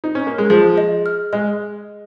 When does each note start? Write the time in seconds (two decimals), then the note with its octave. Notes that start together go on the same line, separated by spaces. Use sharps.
0.04 D#4
0.15 C#4
0.27 A#3
0.38 G#3
0.50 F3 G#4
0.78 D#5
1.06 F6
1.33 G#3 D#5